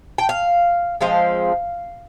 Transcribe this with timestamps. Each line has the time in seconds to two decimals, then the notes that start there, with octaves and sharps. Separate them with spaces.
0.18 G5
0.29 F5
1.01 F3 G#3 C4 F5